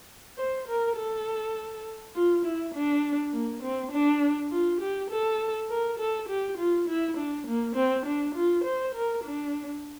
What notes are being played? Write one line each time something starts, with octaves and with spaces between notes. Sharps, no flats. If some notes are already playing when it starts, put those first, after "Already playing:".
C5
A#4
A4
F4
E4
D4
A#3
C4
D4
F4
G4
A4
A#4
A4
G4
F4
E4
D4
A#3
C4
D4
F4
C5
A#4
D4